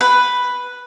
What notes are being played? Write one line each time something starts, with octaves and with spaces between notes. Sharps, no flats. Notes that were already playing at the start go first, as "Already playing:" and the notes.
B4